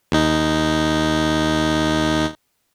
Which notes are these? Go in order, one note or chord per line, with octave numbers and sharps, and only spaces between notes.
D#2 D#4